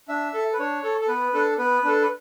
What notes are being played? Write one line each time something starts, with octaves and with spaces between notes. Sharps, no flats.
D4 E5
A4
B4
D4 C#5
A4
A4
B3 B4
D4 A4
B3 B4
D4 A4
B4